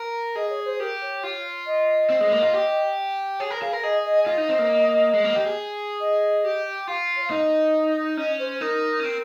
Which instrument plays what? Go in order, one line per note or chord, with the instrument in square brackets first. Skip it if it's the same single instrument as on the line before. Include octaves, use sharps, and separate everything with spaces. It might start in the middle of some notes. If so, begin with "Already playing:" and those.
Already playing: [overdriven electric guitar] A#4
[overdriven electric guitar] G#4 [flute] D#5
[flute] C#5
C5
[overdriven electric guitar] G4 [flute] A#4
[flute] C#5
[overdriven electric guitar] F4
[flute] D#5
[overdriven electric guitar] C4
G#3
A#3
F4
G4
[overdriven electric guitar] G#4 [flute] C#5
[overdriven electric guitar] A#4
[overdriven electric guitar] G#4 [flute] F5
[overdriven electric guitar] A#4
[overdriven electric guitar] G#4 [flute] D#5
[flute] D#5
[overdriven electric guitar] F4 [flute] D#5
[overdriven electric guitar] D#4
C4
A#3
G#3
A#3
G4
G#4
[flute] D#5
[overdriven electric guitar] G4
[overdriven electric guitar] F4 [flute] F5
[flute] C#5
F5
[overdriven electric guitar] D#4 [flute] D#5
[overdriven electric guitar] C#4 [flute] D#5
[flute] C5
[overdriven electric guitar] D#4 [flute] A#4
[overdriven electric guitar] C#4
C4